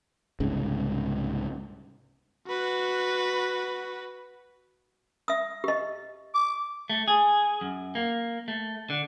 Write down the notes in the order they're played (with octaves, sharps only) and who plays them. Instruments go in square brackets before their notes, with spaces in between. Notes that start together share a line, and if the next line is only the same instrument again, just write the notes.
[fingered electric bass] C2 G#2 C#3
[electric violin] F#4 B4
[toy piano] E5 D#6
G4 D#5
[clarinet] D6
[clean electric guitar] A3
G#4
F#2
A#3
A3
D3